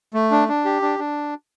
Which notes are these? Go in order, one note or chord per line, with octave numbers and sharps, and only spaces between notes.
A3
D4
D4
G4
D4
D4